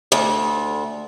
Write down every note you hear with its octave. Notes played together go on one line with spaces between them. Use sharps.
D2